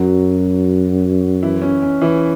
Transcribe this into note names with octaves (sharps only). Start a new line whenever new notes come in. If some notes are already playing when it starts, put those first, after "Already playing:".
Already playing: F#2 F#3 F#4
E3 E4
C#4
C#4
E3 E4